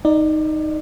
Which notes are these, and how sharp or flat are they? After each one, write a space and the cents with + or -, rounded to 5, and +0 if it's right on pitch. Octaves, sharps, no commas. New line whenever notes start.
D#4 +0 D5 +25